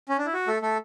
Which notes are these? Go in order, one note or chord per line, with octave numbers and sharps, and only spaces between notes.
C#4
D4
E4
F#4
A3 A4
A3 A4